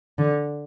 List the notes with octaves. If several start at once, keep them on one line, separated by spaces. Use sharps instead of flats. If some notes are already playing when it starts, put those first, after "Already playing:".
D3